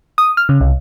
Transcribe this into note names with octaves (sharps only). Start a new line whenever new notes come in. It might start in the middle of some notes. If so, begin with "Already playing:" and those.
D#6
F6
C#3
C2